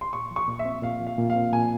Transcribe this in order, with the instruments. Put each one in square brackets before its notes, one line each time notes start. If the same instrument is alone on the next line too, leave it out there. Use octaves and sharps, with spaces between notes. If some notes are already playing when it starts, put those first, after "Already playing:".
[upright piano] C6
[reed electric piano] A#2 [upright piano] C#6
[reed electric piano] F3
[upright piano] C#6
[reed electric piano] A#2
[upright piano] E5
[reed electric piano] C4
[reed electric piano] A#2 [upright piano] F5
[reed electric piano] F3
[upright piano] F5
[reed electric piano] A#2
[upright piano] F5
[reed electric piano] C4
[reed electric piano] A#2 [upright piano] G#5